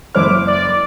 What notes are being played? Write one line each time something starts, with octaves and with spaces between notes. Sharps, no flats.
F#1 E4 C5 D6 F6
D5